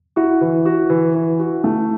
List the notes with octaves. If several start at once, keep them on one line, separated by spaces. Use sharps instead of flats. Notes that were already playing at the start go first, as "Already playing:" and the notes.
E4 F#4
E3
F#4
E3
E3
F#4
A3